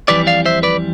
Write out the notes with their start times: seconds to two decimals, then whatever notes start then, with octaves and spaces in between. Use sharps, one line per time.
0.08 F2 E3 G3 B4 D5
0.27 D5 F5
0.46 C5 E5
0.63 B4 D5